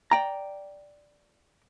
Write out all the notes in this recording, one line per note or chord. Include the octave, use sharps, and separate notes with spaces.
D5 G5 A#5